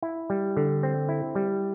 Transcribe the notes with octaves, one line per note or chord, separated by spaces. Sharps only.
E4
G3
D3
C4
E4
G3